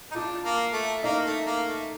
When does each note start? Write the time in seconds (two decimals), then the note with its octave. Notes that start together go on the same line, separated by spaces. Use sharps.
0.11 D#4
0.15 D4 F4
0.44 A#3
0.73 A3
1.03 A#3 D#4
1.24 A3
1.46 A#3
1.68 A3